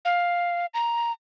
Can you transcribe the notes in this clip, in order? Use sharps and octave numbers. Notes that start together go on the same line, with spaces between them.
F5
A#5